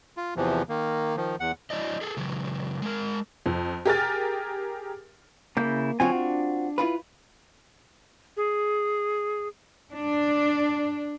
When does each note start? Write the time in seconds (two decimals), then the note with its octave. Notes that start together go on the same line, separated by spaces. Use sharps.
0.17 F4
0.36 E2 C3 E3 F3
0.69 D#3 A#3
1.17 D#3 F3
1.40 E2 F#5
1.70 F#3 E4 D5 D#5
2.01 G#4 A4
2.17 C#3 E3 F#3
2.82 G#3 A#4
3.46 F2
3.86 G4 G#4 A#4 G#5 F6 A6
5.57 C#3 A#3 E4 G6
6.00 D3 F#3 C4 F4 F#4 G#5
6.15 D4
6.78 E4 F4 B4
8.37 G#4
9.92 D4